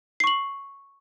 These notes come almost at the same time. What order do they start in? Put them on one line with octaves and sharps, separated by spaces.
C7 C#6 F#7